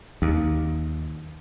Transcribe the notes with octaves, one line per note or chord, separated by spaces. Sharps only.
D#2